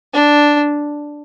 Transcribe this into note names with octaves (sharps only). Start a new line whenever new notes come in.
D4